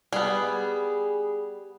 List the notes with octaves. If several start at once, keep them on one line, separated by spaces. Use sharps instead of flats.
G3 B3 G#4